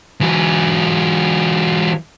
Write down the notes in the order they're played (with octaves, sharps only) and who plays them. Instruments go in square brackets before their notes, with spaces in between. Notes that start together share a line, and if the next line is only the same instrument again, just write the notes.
[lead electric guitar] E3 F#3